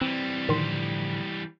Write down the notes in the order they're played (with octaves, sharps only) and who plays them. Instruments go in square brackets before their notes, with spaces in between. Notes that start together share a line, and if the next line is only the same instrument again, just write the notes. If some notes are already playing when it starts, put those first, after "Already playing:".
[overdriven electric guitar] E3 G3 [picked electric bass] C4
[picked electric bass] A2 D3 F3 [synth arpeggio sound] D#3 C6